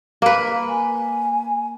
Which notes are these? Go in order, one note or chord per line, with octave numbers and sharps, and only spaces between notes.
A#3 B4
G#5